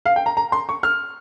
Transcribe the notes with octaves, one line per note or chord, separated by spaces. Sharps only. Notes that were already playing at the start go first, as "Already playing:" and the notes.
F5
G5
A#5
A#5
C6
C#6
F6